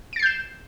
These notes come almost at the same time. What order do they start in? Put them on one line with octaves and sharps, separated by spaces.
D7 A6 C7 G6 E7